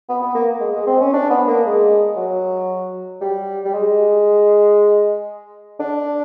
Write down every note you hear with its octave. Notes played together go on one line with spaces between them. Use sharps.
B3
B3
A#3
G#3
G#3
C4
C#4
D4
B3
A#3
G#3
F#3
G3
G3
G#3
D4